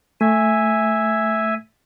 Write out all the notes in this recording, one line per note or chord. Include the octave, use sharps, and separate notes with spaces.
A3 E5 G#5